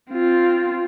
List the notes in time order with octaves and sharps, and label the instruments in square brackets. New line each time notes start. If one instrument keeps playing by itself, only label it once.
[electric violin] C4 F4